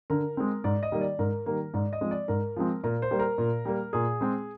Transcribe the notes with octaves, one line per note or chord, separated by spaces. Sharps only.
D3 A#4
G#3 C4
G#2 D5
D#5
D#3 G3 A#3
D5
G#2 A#4
D#3 G3 A#3
G#2 D5
D#5
F3 G#3 C4
D5
G#2 A#4
F3 G#3 C4
A#2 A#4
C5
G3 A#3
A#4
A#2
G3 A#3
A#2 G#4
G#3 C4